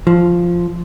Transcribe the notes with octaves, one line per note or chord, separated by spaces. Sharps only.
F3